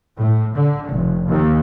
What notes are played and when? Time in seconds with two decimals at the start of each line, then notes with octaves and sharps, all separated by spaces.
0.17 A2
0.54 D3
0.90 F1
1.27 D#2